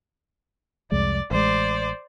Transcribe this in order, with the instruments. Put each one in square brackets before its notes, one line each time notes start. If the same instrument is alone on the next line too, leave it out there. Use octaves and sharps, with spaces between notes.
[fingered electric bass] C2 F2 G#3 [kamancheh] D5
[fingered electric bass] A1 G#3 [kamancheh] C5 D5